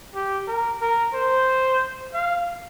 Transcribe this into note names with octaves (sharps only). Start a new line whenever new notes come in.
G4
A#4
A#4
C5
F5